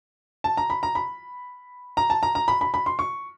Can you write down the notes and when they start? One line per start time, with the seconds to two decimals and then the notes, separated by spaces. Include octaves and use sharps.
0.44 A5
0.57 A#5
0.70 B5
0.83 A#5
0.95 B5
1.97 A#5
2.10 A5
2.23 A#5
2.35 A#5
2.48 B5
2.61 B5
2.74 B5
2.86 C6
2.99 C#6